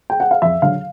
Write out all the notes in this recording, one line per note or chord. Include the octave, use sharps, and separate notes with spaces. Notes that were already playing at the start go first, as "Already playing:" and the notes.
G5
F#5
F5
F2 E5
D3 F#3 F5